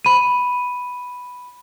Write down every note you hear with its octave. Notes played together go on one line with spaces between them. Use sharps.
B5 D#7